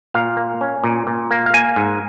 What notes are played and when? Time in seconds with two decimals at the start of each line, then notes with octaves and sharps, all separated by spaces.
0.14 A#2 F5
0.37 A#3
0.61 C#4
0.84 A#2
1.07 A#2
1.31 A#3
1.46 F5
1.54 A#3 G#5
1.76 G#2